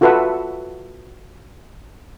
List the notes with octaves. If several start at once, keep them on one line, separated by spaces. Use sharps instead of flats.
F4 F#4 A4 B4 E5 F#5